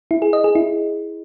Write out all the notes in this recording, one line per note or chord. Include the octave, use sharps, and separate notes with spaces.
E4
G#4
D#5
G#4
E4